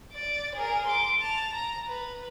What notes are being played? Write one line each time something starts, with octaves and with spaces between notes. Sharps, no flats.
D5
G#4 A#4
C6 D6
A5 F7
A#5
B4